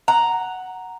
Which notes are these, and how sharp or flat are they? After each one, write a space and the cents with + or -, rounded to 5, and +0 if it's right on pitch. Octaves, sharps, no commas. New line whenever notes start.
F#5 +0 A#5 +0